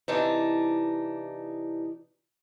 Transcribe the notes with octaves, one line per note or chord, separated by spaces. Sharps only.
C3 E3 D4 D#4